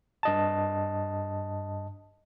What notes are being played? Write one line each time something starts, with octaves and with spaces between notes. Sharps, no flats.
G2 D#5 A5